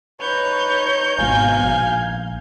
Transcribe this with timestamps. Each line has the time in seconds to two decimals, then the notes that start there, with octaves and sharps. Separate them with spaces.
0.21 D#4 B4 C#5 G6
1.19 G#1 G#2 B2 F5 G#5
1.57 A#1